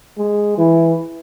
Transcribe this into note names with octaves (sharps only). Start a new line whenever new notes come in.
G#3
E3